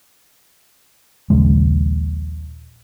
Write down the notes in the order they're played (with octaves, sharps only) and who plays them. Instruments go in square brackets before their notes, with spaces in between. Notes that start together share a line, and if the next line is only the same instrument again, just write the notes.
[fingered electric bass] A#1 D#2 C#3 G#3